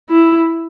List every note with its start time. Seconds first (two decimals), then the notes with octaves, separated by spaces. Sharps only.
0.09 E4